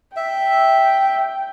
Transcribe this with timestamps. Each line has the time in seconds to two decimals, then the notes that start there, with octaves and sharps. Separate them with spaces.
0.16 E5 G5